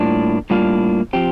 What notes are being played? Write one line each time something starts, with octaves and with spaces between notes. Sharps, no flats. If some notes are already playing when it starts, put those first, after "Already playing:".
Already playing: A2 G3 A#3 D4 F4
A2 G3 A#3 D4 F4
F3 C4 G4